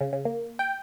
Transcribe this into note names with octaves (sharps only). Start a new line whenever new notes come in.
C#3
C#3
A#3
G5